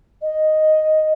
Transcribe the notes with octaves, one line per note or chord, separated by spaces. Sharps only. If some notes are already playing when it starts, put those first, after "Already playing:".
D#5